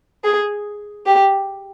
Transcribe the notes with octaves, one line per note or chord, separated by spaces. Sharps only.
G#4
G4